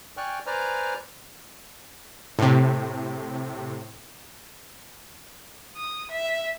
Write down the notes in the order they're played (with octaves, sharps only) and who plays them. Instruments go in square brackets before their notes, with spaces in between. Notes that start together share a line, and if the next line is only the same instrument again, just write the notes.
[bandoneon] D5 G5 G#5 C#6 F6 F#6
B4 C5 D5 G#5 A#5 F6
[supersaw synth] A2 C3
[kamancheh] D#6
E5